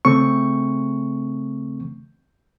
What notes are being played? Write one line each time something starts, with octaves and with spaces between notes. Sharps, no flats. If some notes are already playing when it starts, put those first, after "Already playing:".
C#3 A3 C4 C#6